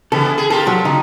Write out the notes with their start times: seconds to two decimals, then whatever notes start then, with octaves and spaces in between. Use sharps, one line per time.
0.12 C#3 E3 B3 A4
0.38 G#4
0.50 F4 G4 A4 A#4
0.67 F#3
0.85 C#3 D#4